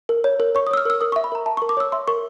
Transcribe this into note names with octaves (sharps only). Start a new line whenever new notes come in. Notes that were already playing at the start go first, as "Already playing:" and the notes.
A#4
C#5
A#4
C#5 C#6
D#6
C#5 E6
F6
A#4 E6
A#4 D#6
C#6
E5
B5
A#4 A#5
E5 A5
C#6
A#4
D6
C#5 E6
E5 C6
A#4 C#6